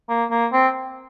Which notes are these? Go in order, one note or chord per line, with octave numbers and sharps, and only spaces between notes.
A#3
A#3
C4